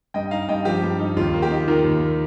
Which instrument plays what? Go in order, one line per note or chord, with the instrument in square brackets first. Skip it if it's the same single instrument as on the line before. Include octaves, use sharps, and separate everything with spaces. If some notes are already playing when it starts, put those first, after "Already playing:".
[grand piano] G2 D#5 G5
D#4 F5 A#5
G2 D#5 G5
F3 G4
G2
D#4
D#2 F4
A#3
G4
D#4
D#3 F4 A#4
D#2
A#3